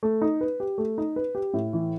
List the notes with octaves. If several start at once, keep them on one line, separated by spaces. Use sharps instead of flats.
A3
D#4
B4
G4
A3
D#4
B4
G4
A2
E3